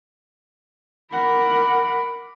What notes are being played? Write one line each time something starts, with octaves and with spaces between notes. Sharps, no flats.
A#4 F#5 B5 D6